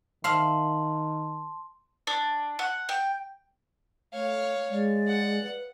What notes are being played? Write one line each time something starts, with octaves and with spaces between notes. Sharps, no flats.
D#3 E5 F5 A5 C6
D4
F#5
G5
A3 C#5 F5
G#3 D5
F#5
B4